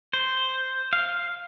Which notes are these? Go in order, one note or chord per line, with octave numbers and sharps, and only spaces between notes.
C5
F5